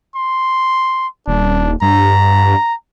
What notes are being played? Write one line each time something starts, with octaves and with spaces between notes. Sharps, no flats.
C6
D#1 D4
G2 A#5